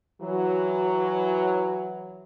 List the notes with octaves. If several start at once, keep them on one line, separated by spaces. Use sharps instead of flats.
E3 F#3